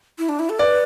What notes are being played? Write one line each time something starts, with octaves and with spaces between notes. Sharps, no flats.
E4
D4
E4
A4
B4 D5